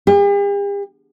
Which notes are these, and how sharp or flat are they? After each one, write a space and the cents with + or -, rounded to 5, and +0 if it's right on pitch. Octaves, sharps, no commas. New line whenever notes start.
G4 +45